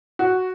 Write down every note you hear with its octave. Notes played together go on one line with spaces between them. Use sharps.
F#4